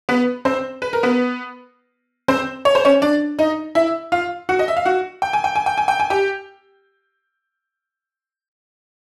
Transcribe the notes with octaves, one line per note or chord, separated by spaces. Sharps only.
B3 B4
C4 C5
B4
A#4
B3 B4
C4 C5
C#5
C5
C#4 C#5
D4 D5
D#4 D#5
E4 E5
F4 F5
F#4 F#5
D#5
E5
F5
F#4 F#5
G5
G#5
G5
G#5
G5
G#5
G5
G#5
G4 G5